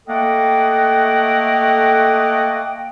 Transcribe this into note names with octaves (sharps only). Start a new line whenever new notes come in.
A3 A#3 A4 D#5 F#5 G5